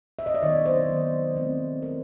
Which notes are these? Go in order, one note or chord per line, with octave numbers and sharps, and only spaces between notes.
E5
D#5
D5
D#3 F#3 B3 C#5
C5
D#3 F#3 B3
F3 A3 C4 E4
F3 A3 C4 E4 A#4